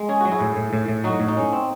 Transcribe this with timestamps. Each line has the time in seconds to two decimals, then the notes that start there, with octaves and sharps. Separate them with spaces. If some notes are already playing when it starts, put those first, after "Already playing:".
Already playing: G#3
0.09 C#4 G#4
0.21 F#3 F#4
0.32 E4 G#4
0.41 A2
0.56 A2
0.73 A2
0.88 A2
1.04 F#3 D#4 F#4
1.20 A2
1.28 D#4
1.37 C#4
1.53 C4